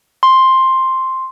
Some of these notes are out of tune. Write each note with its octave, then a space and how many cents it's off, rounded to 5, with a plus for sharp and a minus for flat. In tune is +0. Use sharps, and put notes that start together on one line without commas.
C6 +5